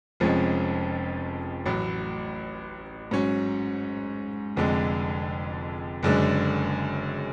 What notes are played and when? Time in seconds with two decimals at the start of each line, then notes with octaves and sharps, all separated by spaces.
0.20 F1 F2 F3 G#3 C#4
1.66 A1 A2 F#3
3.11 G#2 F#3 C#4
4.56 F1 F2 D3 G#3
6.03 F#1 F#2 D3 G#3 D4